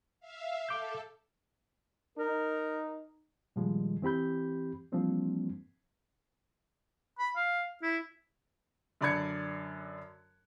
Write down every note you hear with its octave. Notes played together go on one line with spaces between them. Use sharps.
E5 F5
A4 D6 G6
D#4 A#4
A#2 D#3 F3 G3 G#3
E3 C4 G4 B5 G6
E3 F3 G3 A#3 C4 D4
B5
F5
E4
F#2 D3 D5 B5 G#6 C#7